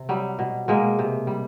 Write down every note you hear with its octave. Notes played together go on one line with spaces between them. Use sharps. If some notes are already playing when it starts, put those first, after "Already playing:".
Already playing: C3
F#3 G3
B2
B2 G#3 A#3
C3
G3